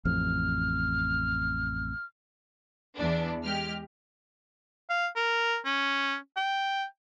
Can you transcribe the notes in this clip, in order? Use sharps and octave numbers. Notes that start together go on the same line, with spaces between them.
A1 F2 F6
E2 D4
G#3 G4 F6
F5
A#4
C#4
G5